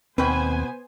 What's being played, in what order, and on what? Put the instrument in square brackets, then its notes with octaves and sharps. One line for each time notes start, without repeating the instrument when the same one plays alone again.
[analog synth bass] D#2 [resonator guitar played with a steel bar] B2 B4 [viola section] B3 C5 G#5 [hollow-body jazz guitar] C4 G5